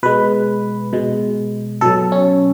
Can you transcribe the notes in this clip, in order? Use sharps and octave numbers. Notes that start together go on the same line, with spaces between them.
B2 G#3 B4
B2 G#3
B2 F#3 A4
C#4